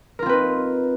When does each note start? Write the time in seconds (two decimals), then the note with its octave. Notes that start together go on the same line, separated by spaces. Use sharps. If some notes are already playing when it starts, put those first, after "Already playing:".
0.19 A#4
0.22 F4
0.26 C4
0.29 B4
0.33 D#4